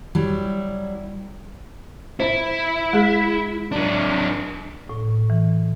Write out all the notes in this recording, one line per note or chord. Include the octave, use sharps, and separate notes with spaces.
F#3 G3 E4
E4 C5
G#3 G#4
F#3 D4
A2
E3